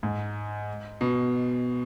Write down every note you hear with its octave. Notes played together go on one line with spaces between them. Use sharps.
G#2
B2